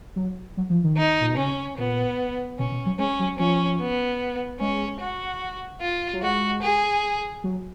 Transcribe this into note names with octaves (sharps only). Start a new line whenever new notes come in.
F#3
F#3
F3
D#3
D#4
A#2
B2
C#3 C#4
A#2 B3
B2 C#4
B2
F#3
G#3 C#4
F#3
F3 C#4
B3
G#3 C#4
F#4
F4
F#3
G#3 F#4
G#4
F#3